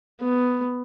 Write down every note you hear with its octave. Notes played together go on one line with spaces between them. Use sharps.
B3